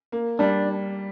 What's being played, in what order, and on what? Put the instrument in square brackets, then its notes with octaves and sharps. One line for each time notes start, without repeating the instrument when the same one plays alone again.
[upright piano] A#3
[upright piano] G3 [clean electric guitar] D4